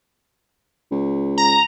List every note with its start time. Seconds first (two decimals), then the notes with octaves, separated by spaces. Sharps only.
0.91 C#2
1.38 A#5